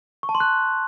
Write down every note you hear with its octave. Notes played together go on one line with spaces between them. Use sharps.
C#6
A5
C6
F#6